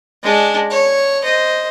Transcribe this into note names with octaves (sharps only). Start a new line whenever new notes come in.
G#3 D4
C#5
C5 D#5